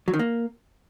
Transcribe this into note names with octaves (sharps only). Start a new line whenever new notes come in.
F#3
D#3
A#3